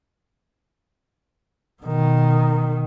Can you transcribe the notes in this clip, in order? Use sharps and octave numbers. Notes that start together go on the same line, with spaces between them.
B2 D#3